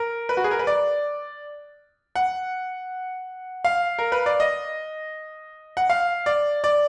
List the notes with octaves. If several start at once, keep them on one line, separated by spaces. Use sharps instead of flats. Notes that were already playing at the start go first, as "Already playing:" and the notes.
Already playing: A#4
B4
F#4
G#4
A#4
B4
D5
F#5
F5
A#4
B4
D5
D#5
F#5
F5
D5
D5